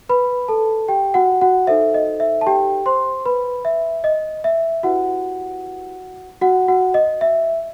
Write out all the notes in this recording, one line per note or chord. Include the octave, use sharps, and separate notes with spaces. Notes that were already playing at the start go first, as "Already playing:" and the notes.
B4 B5
A4 A5
G4 G5
F#4 F#5
F#4 F#5
D#4 A4 C5 E5
D#5
E5
A5
G4 G5
C5 C6
B4 B5
E5
D#5
E5
E4 F#4 G4 B4 F#5
F#4 F#5
F#4 F#5
D#5
E5